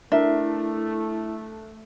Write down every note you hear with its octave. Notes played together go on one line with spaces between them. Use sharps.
A3 D4 E4 A#4 E5